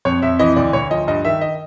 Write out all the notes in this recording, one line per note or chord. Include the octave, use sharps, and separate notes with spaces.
F2 C#5
F2 E5
E3 D#5
D2 D5
D2 C#5
F3 D#5
G2 D#5
D#3 E5
D#5